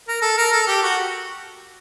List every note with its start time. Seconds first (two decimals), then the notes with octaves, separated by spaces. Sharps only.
0.08 A#4
0.22 A4
0.38 A#4
0.53 A4
0.67 G4
0.83 F#4